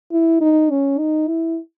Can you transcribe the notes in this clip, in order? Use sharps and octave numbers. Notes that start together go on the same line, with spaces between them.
E4
D#4
C#4
D#4
E4